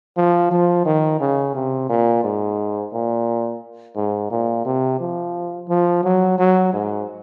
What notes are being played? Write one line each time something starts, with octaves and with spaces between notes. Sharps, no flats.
F3
F3
D#3
C#3
C3
A#2
G#2
A#2
G#2
A#2
C3
F3
F3
F#3
F#3
G#2